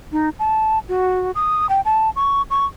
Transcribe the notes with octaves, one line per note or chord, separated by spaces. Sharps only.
D#4
A5
F#4
D#6
G5
A5
C#6
C#6